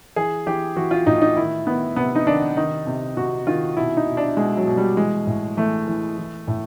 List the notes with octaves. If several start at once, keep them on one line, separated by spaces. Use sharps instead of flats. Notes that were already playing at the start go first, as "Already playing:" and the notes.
E3 G#4
E3 G4
E3 F#4
F4
A2 D#4
D#4
D#3 E4
D#3 B3
C3 B3
D#4
D#3 D4
D#3 D#4
C3
C3 F#4
D#3 F4
B2 E4
D#4
B2
D4
B2 G#3
F#3
B2
G3
E3 G#3
A2
E3 A3
E3
E3
A2